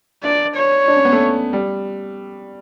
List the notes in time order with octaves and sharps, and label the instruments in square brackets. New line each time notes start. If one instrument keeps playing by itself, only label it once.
[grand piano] D4 [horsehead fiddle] D5
[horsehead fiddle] C#5
[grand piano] D4
C#4
B3
A3
G3